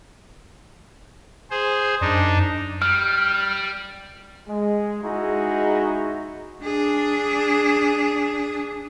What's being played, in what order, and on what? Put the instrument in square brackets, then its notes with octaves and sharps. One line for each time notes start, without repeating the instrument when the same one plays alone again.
[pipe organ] G#4 C5
[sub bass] F#2 [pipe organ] D4 D#4
[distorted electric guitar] G3 [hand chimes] F6
[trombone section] G#3
G#3 D#4 E4 F#4 G#4
[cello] D4 G#4